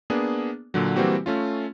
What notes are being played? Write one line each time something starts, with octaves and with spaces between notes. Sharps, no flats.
A#3 B3 D4 G#4
A#2 D3 F#3
E3 G3 A#3 C4 F#4 G4
A3 C#4 F4